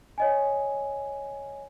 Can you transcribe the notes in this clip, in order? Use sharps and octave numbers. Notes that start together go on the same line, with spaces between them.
C#5 D#5 G#5